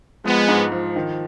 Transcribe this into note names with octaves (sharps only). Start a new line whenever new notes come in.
F3 G#3 B3
G#2
F3
D#3